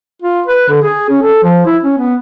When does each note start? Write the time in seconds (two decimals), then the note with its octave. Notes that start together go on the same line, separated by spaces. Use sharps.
0.22 F4
0.47 B4
0.69 D3
0.82 G#4
1.09 C#4
1.22 A4
1.43 F3
1.66 E4
1.83 C#4
1.98 B3